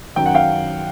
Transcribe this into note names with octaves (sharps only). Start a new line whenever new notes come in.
F#2 D#3 F#3 G5
F#5
F5 G5